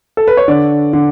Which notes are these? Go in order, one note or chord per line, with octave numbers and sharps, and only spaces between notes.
A4
B4
C#5
D3 D5
D3